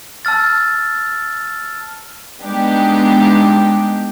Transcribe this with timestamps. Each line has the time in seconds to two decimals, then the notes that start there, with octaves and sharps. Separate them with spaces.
0.25 A5 E6 F6 A6
2.42 G#3 B3 D4 D#4 G4